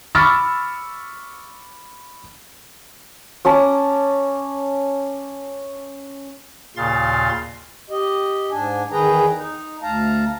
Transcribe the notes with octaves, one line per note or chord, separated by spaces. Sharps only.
B5 C#6 D6 E6 F6 A6
C#4 A5 A#5 D6
D#2 A#2 C#3 F5 C6 A6
G4 D#5
G#2 D4 G#5
E2 D#3 G#4 B4 G5 A#5
D#4
D2 F5 A5 A#5